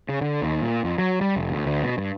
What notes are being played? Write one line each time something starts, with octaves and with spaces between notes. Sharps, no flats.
C#3
D3
D#2
A#2
F2
F#3
G3
F1
D2
D2
B2
G2